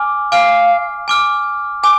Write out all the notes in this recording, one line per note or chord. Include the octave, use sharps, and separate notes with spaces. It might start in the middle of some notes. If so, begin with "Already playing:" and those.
Already playing: G#5 D6 F6
F5 G#5 D6 F6
G#5 D6 F6
G#5 D6